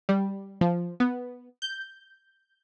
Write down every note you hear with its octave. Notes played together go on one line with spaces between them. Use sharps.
G3
F3
B3
G6